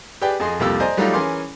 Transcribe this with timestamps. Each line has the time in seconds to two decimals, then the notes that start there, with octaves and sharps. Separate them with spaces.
0.22 G4 G#4 B4 D5 G5
0.40 F2 G#4 D#5 C6
0.60 C2 F2 A#3 F4 G4 E6
0.80 C5 D5 D#5 G#5 A#5
0.97 F#3 G3 A3 D#4 F4 G4
1.13 E3 C#4 G#4 A#4 C6 D6